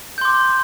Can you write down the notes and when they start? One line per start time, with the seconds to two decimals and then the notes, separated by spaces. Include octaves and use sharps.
0.18 G6
0.21 C6
0.25 D6